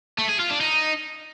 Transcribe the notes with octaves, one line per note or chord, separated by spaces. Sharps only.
A3
G#4
F4
D4
D#4